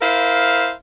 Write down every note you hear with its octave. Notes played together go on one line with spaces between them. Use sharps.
E4 A#4 C5 F5